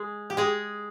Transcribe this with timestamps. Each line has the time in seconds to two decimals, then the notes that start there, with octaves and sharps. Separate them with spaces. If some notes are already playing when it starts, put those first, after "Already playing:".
Already playing: G#3 G#4
0.30 G4
0.37 G#3 G#4